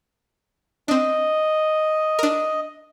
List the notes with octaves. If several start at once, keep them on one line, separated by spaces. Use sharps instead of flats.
C4 D4 D#5
D4 A#4